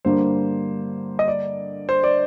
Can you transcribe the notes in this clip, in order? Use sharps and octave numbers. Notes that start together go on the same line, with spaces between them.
G2 D3 G3 A#3 C5
D#5
D5
C5
D5